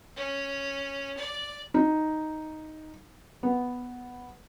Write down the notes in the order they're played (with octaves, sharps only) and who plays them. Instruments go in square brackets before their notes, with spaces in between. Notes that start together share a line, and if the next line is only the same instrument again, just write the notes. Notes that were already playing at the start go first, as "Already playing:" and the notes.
[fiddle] C#4
D5
[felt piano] D#4
B3